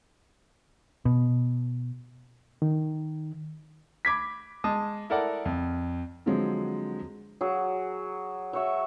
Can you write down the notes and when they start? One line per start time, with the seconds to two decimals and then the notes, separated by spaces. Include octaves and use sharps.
1.05 B2
2.62 D#3
4.05 B5 D6 G#6 B6
4.64 G#3 A5 D#6
5.10 E4 A4 A#4 D5 F#5
5.45 F2
6.26 D3 F3 F#3 G#3 C4
7.41 F#3 G#4
8.53 F#3 C#5 E5